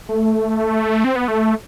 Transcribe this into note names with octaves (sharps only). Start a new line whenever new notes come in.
A3
C4
B3
A3